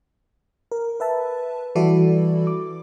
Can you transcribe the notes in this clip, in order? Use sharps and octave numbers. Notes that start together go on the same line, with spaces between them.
A#4
B4 E5 A5
E3 G3 E4 F#4 A4 D5
D6